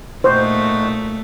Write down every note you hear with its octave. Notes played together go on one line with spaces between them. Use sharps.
A#2 A3 D#4 F#4 C5